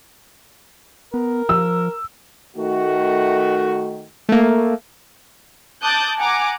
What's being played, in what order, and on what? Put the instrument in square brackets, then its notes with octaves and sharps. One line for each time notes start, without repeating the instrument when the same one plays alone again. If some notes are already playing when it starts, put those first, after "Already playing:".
[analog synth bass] B3 [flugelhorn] A#4
[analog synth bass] F3 [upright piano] E6
[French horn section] D#3 A3 F#4
[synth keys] A3 A#3
[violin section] A5 D6 D#6 F#6 G6 A6
F#5 G#5 A#5 D6